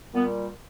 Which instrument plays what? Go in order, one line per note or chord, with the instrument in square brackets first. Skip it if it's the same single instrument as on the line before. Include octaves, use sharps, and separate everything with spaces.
[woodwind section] A#2 G3 B3